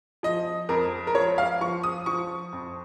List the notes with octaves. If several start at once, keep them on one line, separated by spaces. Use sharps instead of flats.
F3 D#5
F2 A#4
A#4
F3 C#5
F5
F3 C#6
D#6
F3 C#6
F2